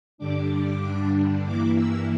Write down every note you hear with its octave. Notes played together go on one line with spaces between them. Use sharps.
G2 D3 G3 D4 D6
G2 E3 A#3 E4 D6
E6